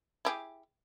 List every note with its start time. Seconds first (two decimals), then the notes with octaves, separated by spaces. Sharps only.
0.25 E4 G4 G#4